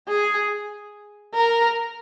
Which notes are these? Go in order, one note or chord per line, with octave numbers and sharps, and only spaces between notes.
G#4
A#4